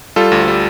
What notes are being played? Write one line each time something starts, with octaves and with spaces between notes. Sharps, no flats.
G3 F4 A4
D2
G3